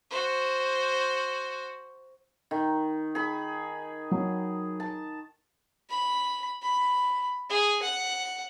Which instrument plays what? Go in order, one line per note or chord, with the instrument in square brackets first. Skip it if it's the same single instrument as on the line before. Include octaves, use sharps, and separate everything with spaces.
[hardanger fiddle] F#4 C5
[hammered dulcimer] D#3
G#4 B5
[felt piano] F#3
[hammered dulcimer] A5
[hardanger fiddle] B5
B5
G#4
F#5